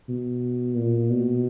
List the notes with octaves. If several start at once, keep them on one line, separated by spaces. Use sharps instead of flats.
B2
A#2
B2